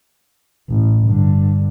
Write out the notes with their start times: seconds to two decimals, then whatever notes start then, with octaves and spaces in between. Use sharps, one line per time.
0.69 A1
1.06 G2 D3